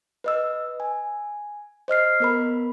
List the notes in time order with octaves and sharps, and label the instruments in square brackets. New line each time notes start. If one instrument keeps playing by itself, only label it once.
[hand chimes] B4 D#5 E6
G#5
C5 D#5 F6 C7
B3 A#4 B5